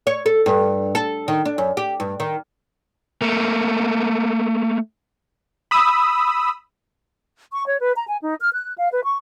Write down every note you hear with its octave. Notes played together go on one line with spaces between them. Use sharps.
C#5
A4
G2
A4
D#3
D4
F#2
G4
G2
D#3
A3 A#3
B5 D#6 E6
C#6
C#5
B4
A#5
G#5
D#4
F6
F#6
F5
B4
C#6